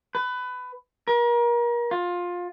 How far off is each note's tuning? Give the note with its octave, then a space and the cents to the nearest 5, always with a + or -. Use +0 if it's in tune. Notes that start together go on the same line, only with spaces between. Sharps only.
B4 +20
A#4 +35
F4 +20